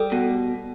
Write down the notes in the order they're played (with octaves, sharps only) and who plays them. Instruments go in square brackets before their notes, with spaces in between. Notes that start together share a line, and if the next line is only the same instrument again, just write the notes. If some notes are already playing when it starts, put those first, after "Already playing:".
Already playing: [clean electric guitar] G3 [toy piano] A4
[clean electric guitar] B2